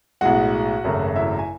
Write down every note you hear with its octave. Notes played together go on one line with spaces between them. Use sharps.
B1 A2 G#3 F#4 F#5
G#1 F#2 C#3 F#3 A3
E4 E5
G#5